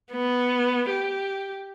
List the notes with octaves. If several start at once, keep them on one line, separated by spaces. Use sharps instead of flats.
B3
G4